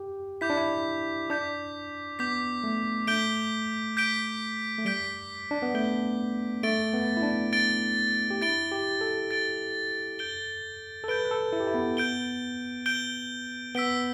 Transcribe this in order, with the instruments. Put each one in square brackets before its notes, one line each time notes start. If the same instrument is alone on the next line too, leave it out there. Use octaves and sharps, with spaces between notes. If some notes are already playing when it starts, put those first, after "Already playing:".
Already playing: [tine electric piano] G4
[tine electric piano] E4 [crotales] D6 G6 B6
[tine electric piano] D4
E4
[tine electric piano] D4 [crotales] D6 G6 B6
[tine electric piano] B3 [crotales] D6 G6 B6
[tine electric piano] A3
[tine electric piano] A3 [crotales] G6 B6 D7 G7
[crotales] G6 B6 D7 G7
[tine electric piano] A3
[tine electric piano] G3 [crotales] G6 B6 D7 G7
[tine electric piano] D4
B3
[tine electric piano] A3 [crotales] G6 B6 D7 G7
[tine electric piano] A3 [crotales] A6 D7 G7
[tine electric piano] B3
E4
D4
[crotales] A6 D7 G7
[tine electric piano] G4
[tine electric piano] E4 [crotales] A6 D7 G7
[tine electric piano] G4
A4
[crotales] A6 D7 G7
G6 D7 G7
[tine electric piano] A4
[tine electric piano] B4 [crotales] G6 D7 G7
[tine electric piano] B4
A4
E4
G4
E4
B3
[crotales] G6 D7 G7
G6 D7 G7
[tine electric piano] B3 [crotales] E6 B6 D7 G7